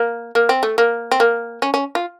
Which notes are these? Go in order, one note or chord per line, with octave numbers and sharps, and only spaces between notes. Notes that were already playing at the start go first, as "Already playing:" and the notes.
Already playing: A#3
A#3
C4
A3
A#3
C4
A#3
C#4
C#4
F4